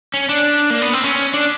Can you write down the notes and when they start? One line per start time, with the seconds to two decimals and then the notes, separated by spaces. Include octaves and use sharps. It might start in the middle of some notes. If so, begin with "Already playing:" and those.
0.14 C#4
0.29 D4
0.70 A#3
0.81 B3
0.93 C4
1.04 C#4
1.34 D4